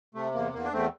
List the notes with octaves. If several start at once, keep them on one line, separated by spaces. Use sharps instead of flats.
C3 A3
E2 A#3
E2 A#3
D4
E2 A3 C4